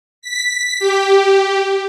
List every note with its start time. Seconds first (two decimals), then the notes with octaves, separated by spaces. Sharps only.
0.22 B6
0.79 G4